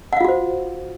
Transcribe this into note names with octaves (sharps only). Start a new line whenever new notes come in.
F4 F#4 C5 F5 F#5